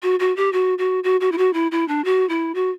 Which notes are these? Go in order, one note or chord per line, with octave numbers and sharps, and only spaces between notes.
F#4
F#4
G4
F#4
F#4
F#4
F#4
E4
F#4
E4
E4
D4
F#4
E4
F#4